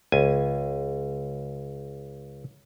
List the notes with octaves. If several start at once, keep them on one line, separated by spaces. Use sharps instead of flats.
C#2 G#5